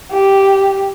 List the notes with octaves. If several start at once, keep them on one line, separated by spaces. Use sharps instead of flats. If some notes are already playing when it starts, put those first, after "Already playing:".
G4